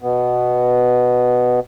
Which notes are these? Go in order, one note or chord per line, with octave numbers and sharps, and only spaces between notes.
B2 B3